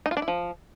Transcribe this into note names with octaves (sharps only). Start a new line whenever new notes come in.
D#4
F4
D4
E4
F3